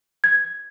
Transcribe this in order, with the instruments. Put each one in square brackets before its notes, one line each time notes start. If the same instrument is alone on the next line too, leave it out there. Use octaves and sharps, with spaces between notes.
[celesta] G#6